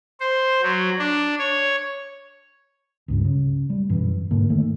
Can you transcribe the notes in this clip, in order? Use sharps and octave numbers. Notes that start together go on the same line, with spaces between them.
C5
F#3
D4
C#5
C#2 G2
C#3
G3
F#2 B2 E3
G#2 D3 A#3
D#3 A3